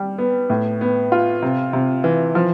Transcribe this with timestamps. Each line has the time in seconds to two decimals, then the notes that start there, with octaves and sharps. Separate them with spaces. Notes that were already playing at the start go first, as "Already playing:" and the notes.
Already playing: G3
0.18 B3
0.50 A2
0.81 B3
1.12 F4
1.42 C3
1.73 C3
2.04 E3
2.35 F3